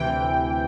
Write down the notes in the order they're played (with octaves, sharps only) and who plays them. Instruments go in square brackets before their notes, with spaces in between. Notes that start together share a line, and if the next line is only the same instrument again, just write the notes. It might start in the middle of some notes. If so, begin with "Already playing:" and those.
Already playing: [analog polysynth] D2 C3 E3 G5